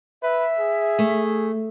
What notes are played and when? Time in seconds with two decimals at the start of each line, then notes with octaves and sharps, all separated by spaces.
0.23 B4 E5
0.59 G#4
0.99 A3